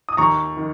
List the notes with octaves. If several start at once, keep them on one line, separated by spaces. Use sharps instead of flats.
D#6
D#2 A#5 C#6
D#3